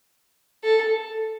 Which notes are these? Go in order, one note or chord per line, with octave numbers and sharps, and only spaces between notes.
A4